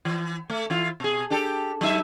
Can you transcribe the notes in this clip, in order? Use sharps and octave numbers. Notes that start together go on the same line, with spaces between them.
E3
A3
E3 E4 F4
B2 G#4
D4 G4 A4
F#3 D#4 E5